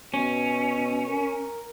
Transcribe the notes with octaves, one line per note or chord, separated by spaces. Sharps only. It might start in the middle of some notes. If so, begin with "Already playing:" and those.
B2 C#4
A#4